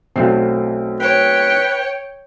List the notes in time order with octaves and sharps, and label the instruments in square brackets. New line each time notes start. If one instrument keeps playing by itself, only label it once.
[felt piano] B1 C7 [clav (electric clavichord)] F#3 A3 C4
[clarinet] B4 [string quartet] C#5 G5